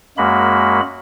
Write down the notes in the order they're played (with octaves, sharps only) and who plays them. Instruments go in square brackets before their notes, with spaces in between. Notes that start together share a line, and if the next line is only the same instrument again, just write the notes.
[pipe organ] F#2 G#3 A#3 F#4 B5